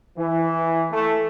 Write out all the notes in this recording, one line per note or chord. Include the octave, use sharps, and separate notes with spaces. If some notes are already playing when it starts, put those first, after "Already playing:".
E3
A3